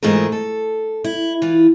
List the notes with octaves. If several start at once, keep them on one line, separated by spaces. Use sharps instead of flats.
G#2 E3 A3 F4 G#4 A#4
A4
E4
E3 F4